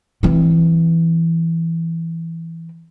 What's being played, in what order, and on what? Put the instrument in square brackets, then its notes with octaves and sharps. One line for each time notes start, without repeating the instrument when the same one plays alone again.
[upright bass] E3 C4